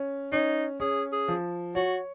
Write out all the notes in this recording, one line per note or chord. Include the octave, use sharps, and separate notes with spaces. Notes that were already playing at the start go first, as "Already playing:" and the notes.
Already playing: C#4
C#4 D#4
C#4 G#4
G#4
F3
F#4 C#5